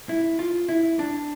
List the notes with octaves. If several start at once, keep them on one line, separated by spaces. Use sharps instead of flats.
E4
F4
E4
D4